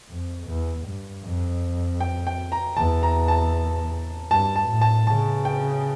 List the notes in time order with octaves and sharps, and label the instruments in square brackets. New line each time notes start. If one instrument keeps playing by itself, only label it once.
[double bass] F2
E2
G2
F2
[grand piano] G5
G5
A#5
[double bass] E2 [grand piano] A5
[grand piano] A#5
A5
[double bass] G2 [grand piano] A5
[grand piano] A5
[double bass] A2
[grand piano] A5
[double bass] C#3 [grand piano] A5
[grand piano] G5